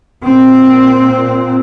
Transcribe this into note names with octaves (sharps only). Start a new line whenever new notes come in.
A#2 C4